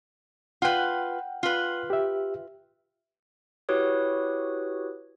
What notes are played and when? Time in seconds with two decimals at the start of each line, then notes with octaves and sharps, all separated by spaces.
0.62 F4 B4 F#5 G5
1.43 F4 B4
1.90 G4 E5
3.69 E4 F#4 G4 B4 C#5 D#6